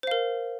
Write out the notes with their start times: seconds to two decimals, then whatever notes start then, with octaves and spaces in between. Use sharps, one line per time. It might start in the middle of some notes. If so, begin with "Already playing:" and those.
0.03 C5
0.07 F5
0.11 A#4